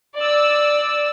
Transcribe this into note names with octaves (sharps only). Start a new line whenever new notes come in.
D5 E6